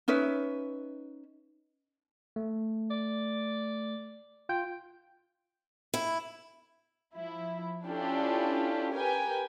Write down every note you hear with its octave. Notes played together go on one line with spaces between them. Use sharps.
C#4 D#4 B4 E5
A3
D5
F4 G5
E4
F3 E4
C#4 D4 E4 F4 G4 A4
G4 A#4 B4 G5 G#5